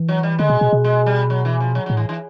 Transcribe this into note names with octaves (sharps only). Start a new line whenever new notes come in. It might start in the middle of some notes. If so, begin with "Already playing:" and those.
Already playing: E3
F#3
G3
D3 G#3
B2
B2
B2
G#3
G3
F#3
E3
F3
F#3
F#3
A2
E3
E3